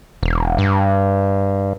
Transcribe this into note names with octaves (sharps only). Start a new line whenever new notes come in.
E1
G2